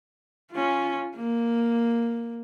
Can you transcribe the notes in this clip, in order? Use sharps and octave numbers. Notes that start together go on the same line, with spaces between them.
C#4 F4
A#3